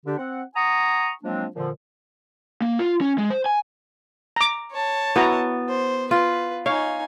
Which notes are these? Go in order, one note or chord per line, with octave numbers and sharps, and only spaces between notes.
D3 D4 G4
C4 F#5
F#5 G#5 A#5 C#6 D#6
F3 F#3 G#3 A#3 C4 D4
A#2 D3 F3
A#3
F4
C#4
G#3
C5
G#5
A#5 D6
C#5 A5
B3 E4 F#4 A#5
C5
F4 B4
D#4 C#5 F5 G#5